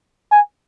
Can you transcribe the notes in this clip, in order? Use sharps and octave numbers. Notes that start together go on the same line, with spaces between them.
G#5